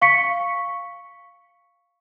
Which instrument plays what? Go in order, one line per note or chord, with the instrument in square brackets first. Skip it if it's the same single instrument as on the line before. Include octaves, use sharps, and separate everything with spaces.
[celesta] F5 C#6 B6 C#7